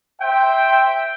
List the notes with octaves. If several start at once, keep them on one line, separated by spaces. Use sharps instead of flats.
C5 E5 G5